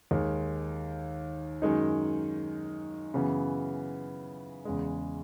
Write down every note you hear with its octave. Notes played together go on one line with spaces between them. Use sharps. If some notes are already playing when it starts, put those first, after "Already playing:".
D#2 D#3 G#3
F#2 D#3 G#3 D#4
F#2 C#3 E3 B3
E2 C#3 G#3